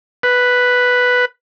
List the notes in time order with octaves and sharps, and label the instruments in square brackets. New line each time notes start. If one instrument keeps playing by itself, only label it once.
[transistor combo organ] B4